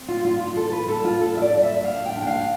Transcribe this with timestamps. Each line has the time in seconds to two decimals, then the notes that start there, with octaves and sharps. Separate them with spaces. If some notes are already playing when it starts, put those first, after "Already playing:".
Already playing: C4
0.08 F4
0.24 G2 F4
0.40 F4
0.56 E3 A4
0.72 B4
0.88 G3 A4
1.05 F4
1.20 G2 A4
1.37 E5
1.42 D5
1.53 G2 D5
1.63 E5
1.84 D4 F5
2.06 G5
2.16 D4
2.22 G5
2.27 F5